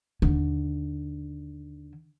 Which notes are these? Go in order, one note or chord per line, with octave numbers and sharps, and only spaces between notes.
D#2 D3